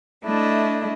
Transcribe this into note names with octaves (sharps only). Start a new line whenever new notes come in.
A3 D4 E4 D#5